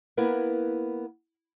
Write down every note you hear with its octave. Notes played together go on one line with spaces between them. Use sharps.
A#3 B3 E4 A#4 B4